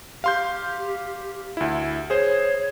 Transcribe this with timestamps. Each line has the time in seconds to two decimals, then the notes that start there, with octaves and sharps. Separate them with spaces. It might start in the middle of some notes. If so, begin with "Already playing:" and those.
0.24 G4 F5 C6 G6
1.57 D2 E4
2.10 G#4 C5 C#5